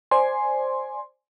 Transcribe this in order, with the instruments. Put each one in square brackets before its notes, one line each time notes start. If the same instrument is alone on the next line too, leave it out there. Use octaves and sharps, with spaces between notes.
[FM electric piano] C5 D5 G#5 C6